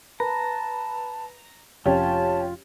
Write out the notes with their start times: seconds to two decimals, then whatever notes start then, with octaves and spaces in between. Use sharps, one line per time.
0.20 B4 A5 A#5
1.86 F1 F2 C#4 F4 G4 A5